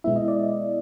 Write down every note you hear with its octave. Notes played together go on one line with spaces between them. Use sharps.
B2 G#3 B3 E4 E5
D#5
D5